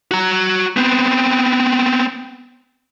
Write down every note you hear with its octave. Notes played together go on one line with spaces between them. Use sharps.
F#4 A#5
B3 C4